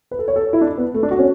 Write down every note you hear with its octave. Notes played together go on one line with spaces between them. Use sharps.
B4
A4
C#5
A4
E4
D4
B3
A3
D4
F#4
C#4